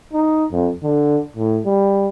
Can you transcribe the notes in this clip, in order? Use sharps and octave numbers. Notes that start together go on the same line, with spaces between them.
D#4
F2
D3
A2
G3